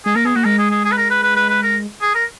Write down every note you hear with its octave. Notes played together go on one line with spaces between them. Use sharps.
G#3 G#4
A#3 A#4
B3 G#4
A#3 F#4
G#3 A#4
G#4
G#4
G#4
B4
A#4
B4
B4
B4
B4
A#4
G#4
A#4